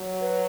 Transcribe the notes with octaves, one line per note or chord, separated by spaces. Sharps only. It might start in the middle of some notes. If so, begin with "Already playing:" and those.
Already playing: F#3
B4